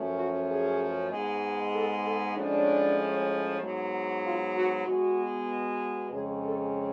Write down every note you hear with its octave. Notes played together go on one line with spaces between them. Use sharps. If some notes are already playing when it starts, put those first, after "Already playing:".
Already playing: F#2 F3 A3 C#4
F#4
G#4
G#2 G#3 B3
A4
A4
A2 F3 G#3 C#4 D4
G#2 F#3 B3
F4
F#4
B2 G#3 B3 F#4
F2 C#3 G#3 C#4 G#4
A4